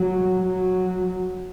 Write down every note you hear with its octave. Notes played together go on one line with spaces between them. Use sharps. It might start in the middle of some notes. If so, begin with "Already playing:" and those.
Already playing: F#3
F#3